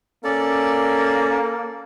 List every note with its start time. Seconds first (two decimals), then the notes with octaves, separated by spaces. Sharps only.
0.24 A#3 C#4 A4 D5